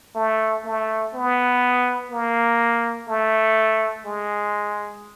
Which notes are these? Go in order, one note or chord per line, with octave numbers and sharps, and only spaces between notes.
A3
A3
B3
A#3
A3
G#3